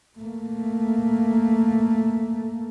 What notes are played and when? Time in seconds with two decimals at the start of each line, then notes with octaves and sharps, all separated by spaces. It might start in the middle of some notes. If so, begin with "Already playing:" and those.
0.19 A3 A#3